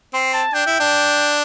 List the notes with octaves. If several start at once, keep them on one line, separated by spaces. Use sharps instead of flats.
C4 C6
A5
D4 G5
E4
D4